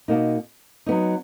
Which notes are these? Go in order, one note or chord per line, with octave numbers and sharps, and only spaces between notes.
B2 A#3 D#4
F#3 B3 D#4